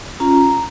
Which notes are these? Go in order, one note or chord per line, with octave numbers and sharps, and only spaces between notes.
C#4 F4 A#5